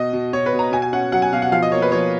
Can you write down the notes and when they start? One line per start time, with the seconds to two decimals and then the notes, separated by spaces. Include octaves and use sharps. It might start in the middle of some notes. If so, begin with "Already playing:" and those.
Already playing: B2 D#5
0.13 B2
0.33 B2 C#5
0.46 B4
0.53 B2
0.59 A#5
0.72 B2 G#5
0.82 G#5
0.93 C#4 F#5
1.12 F#3 F#5
1.22 G#5
1.32 B2 F5
1.42 F#5
1.52 F3 F5
1.62 D#5
1.72 A#3 C#5
1.82 B4
1.92 F3 C#5